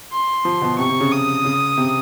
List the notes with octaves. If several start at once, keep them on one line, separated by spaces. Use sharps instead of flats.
C6
F3
B2
C3 C#6
C3
C#3
D#6
C#3
C3